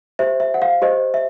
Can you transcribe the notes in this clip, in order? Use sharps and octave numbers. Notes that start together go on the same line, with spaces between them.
G4 C5 E5
E5
F#5
F5
G4 C5 D#5
E5